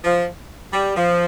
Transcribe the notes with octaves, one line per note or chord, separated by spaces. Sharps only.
F3
G3
F3